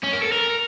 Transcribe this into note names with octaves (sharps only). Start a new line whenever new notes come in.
C#4
A#4
A4
A#4